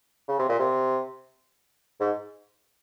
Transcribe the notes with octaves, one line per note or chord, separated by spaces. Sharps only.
C#3
C3
A#2
C3
G#2